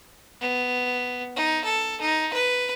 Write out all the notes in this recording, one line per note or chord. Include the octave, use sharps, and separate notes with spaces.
B3
D#4
A4
D#4
B4